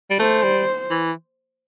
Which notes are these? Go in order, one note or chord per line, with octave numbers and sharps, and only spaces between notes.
G3
A3 C5
G3
E3